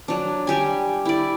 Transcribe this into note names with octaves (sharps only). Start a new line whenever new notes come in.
F#3 D4
G3 G4 G#5
E4 D5